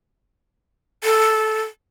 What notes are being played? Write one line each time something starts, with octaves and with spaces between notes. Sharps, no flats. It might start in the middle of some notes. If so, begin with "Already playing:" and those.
A4